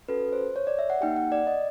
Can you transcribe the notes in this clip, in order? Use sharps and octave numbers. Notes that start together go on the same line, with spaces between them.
C#4 F#4 A4 B4
C5
C#5
D5
E5
F#5
A#3 D#4 G4 G5
F#5
D5
D#5